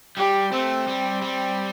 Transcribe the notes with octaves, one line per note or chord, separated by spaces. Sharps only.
G3 G4
A3 C4
G3
G3